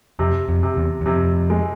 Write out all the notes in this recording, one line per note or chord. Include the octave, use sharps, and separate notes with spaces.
F2 C3
F2
C3
E2
E2
F2 C3
G#3